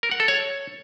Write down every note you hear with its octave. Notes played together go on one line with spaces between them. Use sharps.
A#4
F#5
A4
C#5